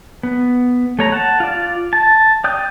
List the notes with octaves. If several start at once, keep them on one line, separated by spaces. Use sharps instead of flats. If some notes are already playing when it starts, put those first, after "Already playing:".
B3
A3 C#5 A#5
F#5 A5
F4 D5
A5
D5 G5 D#6 G6